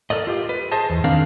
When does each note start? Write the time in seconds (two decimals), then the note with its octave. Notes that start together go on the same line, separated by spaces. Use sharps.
0.10 A4 A#4 D5 D#5
0.27 F4 G4
0.49 B4
0.72 G#4 C5 D#5 A5
0.90 E2
1.04 D#3 C4 D4 A#4 D5 F5